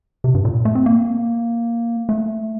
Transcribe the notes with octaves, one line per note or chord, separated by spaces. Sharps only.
C3
G2
A#2
A3
C4
A#3
A3